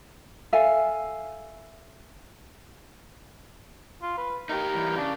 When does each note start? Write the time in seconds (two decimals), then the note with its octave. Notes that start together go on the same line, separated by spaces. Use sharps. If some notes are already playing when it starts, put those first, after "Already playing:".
0.53 A4 E5 F5 G#5
4.02 F4
4.18 B4
4.49 D#4 G4 A#4
4.74 E3 G3
4.97 C#3 D4